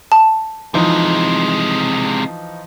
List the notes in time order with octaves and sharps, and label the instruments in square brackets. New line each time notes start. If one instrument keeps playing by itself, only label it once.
[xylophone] A5
[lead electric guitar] C3 G#3 [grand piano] E3 F3 D#4